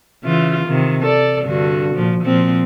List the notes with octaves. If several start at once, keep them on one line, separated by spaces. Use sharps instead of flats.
C#3 E3 F4
C3 D#3
A4 D5
G2 D3 F#4
A#2 F3
A#2 F3 C4